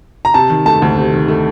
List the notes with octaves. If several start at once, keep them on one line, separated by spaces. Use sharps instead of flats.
A#5
C3 A5
D#3
A3 A5
D2
C3
D#3
A3